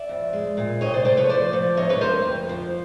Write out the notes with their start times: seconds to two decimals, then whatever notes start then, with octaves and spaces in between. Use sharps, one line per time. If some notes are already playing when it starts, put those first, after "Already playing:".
Already playing: D5 E5
0.09 F2
0.33 G#3
0.57 A#2
0.81 C3 C#5 D#5
0.94 C5 D5
1.05 A3 C5 D5
1.17 B4 C#5
1.29 F3 C5 D5
1.53 F3
1.77 D2 C#5 D#5
1.89 B4 C#5
2.01 D2 A#4 C5
2.25 F2
2.49 F3